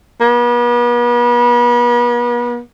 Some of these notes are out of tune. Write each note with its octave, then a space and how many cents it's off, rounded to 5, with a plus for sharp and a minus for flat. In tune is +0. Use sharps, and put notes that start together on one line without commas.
B3 -40